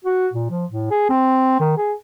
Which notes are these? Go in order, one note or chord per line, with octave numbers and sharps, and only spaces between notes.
F#4
A#2
F3
A2
G#4
C4
D#3
G#4